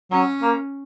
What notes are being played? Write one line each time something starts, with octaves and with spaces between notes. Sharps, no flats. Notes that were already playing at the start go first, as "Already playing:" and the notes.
F#3 C#4
A#3